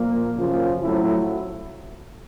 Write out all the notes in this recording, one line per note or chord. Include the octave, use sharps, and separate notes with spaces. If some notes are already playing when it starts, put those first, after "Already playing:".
Already playing: A#2 F3 A#3
F#2 C#3 F3
A2 F#3 A3 C4 E4